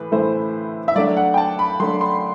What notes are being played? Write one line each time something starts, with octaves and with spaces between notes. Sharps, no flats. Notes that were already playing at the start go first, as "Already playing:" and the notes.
Already playing: A2 E3 B4
A2 E3 A3 E4 C5
E5
F#3 A3 D4 D5
F#5
G5
A5
B5
F#3 A3 D4 C6
C6